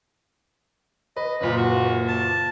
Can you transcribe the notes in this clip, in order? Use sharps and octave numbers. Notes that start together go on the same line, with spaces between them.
B4 D#5
F#1 A#2 B4
F#4
A5